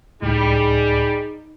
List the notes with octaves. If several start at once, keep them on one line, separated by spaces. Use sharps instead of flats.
C#2 A2 G3 D#4 G#4